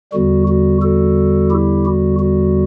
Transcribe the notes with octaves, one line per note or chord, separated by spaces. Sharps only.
E2 D3 G3 F#4
F#4
F#4 A4
E4 G4
F#4
F#4